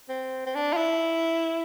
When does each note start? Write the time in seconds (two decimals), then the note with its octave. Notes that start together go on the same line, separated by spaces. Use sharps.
0.09 C4
0.46 C4
0.55 D4
0.73 F4
0.77 E4